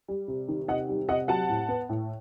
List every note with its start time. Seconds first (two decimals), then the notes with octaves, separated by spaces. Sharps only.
0.08 G3
0.28 C3
0.48 D#3
0.68 C3 D#5 F#5
0.89 G3
1.09 C3 D#5 F#5
1.28 F#3 F#5 A5
1.49 A2
1.68 B3
1.89 A2